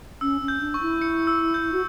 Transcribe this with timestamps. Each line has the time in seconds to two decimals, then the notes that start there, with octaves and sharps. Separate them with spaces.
0.21 C#4 E6
0.41 C#4
0.48 G6
0.61 D4
0.74 C#6
0.81 E4
1.02 C#7
1.27 E6
1.54 G6
1.73 F#4